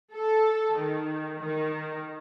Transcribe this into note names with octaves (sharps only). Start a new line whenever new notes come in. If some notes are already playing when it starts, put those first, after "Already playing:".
A4
D#3
D#3